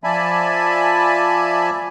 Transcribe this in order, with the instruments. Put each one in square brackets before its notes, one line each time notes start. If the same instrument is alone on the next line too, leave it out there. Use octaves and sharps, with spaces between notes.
[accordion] F3 D5 E5 G#5 A5 B5